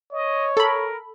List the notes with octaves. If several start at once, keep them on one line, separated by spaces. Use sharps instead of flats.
C#5 D#5
A4 A#4 B5